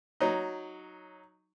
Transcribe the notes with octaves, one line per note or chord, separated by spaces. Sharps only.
F#3 D#4